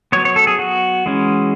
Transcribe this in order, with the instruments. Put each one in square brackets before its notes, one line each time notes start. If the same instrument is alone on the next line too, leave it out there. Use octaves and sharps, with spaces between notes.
[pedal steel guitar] F#3 B3 C#5
C#5
A4
G#4
F#4
E3 G#3 C#4